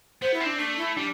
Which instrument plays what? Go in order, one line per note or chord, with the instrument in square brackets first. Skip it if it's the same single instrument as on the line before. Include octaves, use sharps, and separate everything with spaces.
[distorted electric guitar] B3 [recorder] C5
[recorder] E4
[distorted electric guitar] C4
[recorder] D4
[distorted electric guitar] A3 [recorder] D4
[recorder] E4
[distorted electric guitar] G3 [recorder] D4